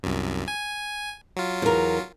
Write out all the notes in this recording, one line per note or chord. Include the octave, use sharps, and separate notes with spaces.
C2 F#2
G#5
F#3 F4
E2 A#4